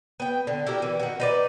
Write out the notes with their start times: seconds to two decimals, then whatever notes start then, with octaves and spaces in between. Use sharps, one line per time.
0.20 B3 G5
0.47 D3
0.67 E4 F#4 G4 A#4
0.82 E3
1.00 D#3 F#4
1.20 D#4 B4 D5